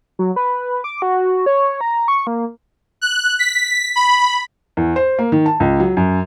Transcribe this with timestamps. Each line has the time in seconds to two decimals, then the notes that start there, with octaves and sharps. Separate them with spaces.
0.19 F#3
0.36 B4
0.84 D6
1.02 F#4
1.46 C#5
1.81 A#5
2.08 C#6
2.27 A#3
3.01 F#6
3.39 B6
3.96 B5
4.77 E2
4.96 C5
5.19 A#3
5.32 D#3
5.46 A5
5.60 C#2
5.80 F#3
5.97 F#2